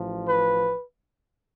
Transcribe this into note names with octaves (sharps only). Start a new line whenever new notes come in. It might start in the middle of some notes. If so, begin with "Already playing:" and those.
Already playing: A1 A2 F3
B4